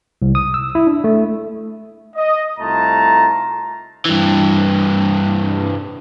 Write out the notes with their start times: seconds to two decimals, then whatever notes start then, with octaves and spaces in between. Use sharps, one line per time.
0.22 C2
0.35 D#6
0.54 E6
0.75 E4
0.87 D4
1.04 A3
2.16 D#5
2.60 C2 A3 D#4 F4 A5 A#5
4.05 G2 E3